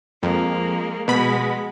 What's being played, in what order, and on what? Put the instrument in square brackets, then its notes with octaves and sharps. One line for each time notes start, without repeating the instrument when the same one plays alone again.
[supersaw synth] F2 [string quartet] F3 G#3 A#3
[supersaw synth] B2 B5 [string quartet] G#3 B3